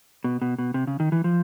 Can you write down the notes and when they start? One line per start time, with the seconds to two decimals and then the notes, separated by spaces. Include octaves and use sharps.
0.24 B2
0.42 B2
0.59 B2
0.74 C3
0.87 C#3
1.00 D#3
1.12 E3
1.24 F3